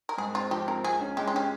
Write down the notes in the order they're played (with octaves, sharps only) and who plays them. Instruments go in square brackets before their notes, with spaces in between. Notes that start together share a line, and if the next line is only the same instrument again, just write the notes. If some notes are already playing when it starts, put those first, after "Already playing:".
[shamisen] A#4
[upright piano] G#2 [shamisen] G#4
[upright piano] C4 [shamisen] F4
[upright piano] F3 [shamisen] G4
[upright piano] C4 [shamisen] A#4
[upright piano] C#2 [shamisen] G#4
[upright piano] C#4
[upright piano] G#3 [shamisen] G4
[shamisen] F4
[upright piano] C#4 [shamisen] G4